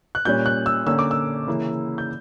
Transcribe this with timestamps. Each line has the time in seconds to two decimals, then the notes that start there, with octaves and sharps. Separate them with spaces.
0.15 F#6
0.25 A#2 G3 C#4 G6
0.46 F#6
0.66 E6
0.86 D3 A#3 C#4 E6
0.99 D6
1.11 E6
1.48 C#3 E3 A#3 E4
1.98 G6